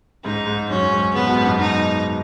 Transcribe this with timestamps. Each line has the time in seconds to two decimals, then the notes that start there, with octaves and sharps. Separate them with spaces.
0.24 G#2 C#3 D#4
0.47 G#2
0.69 F#2 C#4
0.92 G#2
1.14 C#3 B3
1.26 B2
1.36 G#2
1.47 F#2 B2
1.60 D#4